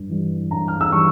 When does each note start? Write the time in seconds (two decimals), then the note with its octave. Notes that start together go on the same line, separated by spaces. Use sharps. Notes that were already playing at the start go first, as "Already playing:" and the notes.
Already playing: G2
0.09 E3 G3
0.51 G2 A#5
0.68 F6
0.81 E6
0.92 E3 G3 C#6